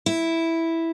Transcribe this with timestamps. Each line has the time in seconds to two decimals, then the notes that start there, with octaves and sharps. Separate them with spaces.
0.06 E4